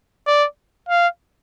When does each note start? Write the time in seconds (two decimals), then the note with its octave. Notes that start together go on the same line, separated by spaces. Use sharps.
0.27 D5
0.89 F5